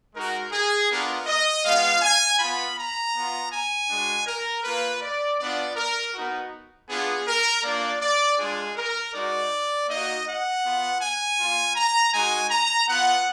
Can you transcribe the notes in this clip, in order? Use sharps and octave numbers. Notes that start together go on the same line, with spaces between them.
G#3 D#4 F#4 A#4
G#4
B3 D4 F4 A#4
D#5
G#3 B3 F4 F5
G#5
B3 F4 B5
A#5
B3 F4
G#5
G#3 D4 F#4
A#4
A#3 F4 B4
D5
B3 D4 F4 D5
A#4
B3 D#4 F#4
B3 D4 F4 G#4
A#4
A#3 D4 F4 D5
D5
G#3 D4 F4 G#4
A#4
G#3 D#4 F#4 D5
A#3 D#4 F#4 D#5
F#5
B3 F4
G#5
A#3 F4
A#5
G#3 D#4 F#4 G#5
A#5
B3 F4 F#5